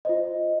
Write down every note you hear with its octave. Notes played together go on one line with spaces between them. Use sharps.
F4 C5 D#5